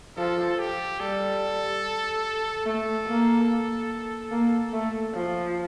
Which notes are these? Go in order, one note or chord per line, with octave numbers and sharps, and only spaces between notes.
F3 A4
G4
G3 A4
A3 A4
A#3
A#3
A3
F3